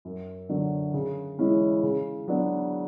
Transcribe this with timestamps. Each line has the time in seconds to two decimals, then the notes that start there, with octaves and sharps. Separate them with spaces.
0.05 F#2
0.49 D3 F#3
0.94 C#3
1.38 E3 G#3 C#4 E4
1.83 C#3
2.28 F#3 B3 D4 F#4